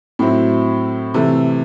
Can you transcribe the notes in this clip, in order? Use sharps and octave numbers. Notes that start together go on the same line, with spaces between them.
A2 F#3 C4 E4
C3 E3 A3